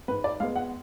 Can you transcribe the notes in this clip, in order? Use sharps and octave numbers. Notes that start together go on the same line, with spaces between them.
G#2 B4
D5
G#3 B3 F5
F#5